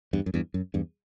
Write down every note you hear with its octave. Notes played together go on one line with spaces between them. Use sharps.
E2 G2
F#2
E2 G2
F#2
E2 G2